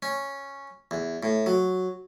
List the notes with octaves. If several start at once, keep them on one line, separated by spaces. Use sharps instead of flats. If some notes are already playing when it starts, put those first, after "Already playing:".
C#4
E2
A2
F#3